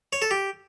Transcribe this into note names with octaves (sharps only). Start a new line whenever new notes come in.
C#5
A4
G4